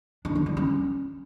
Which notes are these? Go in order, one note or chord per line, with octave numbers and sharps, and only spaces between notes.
D4
A3
G3
C#4